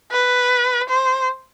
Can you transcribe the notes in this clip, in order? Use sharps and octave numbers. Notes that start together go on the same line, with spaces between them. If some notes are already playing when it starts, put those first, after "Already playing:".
B4
C5